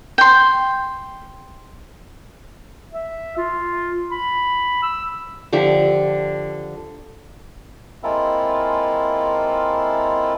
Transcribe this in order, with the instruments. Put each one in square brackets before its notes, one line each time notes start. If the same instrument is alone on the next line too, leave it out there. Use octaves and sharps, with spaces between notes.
[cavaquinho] G5 C6
[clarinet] E5
F4
B5
E6
[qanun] D3 F3 G4 E5
[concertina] G#3 A#3 C4 E4 F4 A4